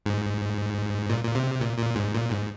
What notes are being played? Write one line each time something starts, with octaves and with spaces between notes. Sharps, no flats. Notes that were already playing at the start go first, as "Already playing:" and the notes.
G#2
A#2
A#2
C3
A#2
A#2
G#2
A#2
G#2